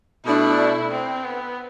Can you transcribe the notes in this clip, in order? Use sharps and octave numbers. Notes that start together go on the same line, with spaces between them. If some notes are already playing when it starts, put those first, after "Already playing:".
B2 A3 D4 E4
C4
B3